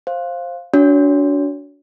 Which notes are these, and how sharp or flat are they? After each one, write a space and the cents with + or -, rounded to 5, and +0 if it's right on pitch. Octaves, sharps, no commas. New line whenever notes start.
C5 +15 F5 +0
D4 -30 F#4 +0 C#5 +30